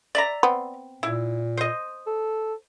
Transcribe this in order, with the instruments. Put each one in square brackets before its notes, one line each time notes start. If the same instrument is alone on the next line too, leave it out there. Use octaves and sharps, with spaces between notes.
[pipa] D5 E5 A#5
[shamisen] B3 C4
[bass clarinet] A#2 [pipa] E4
[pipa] C5 D#5
[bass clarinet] A4